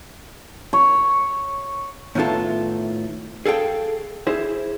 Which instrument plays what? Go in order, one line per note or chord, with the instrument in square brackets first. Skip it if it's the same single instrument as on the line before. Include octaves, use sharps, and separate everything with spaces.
[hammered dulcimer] C#5
[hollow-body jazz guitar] A2 D#3 B3 E4 F4 A4
G#4 A4 F5 G5
E4 G#4 C5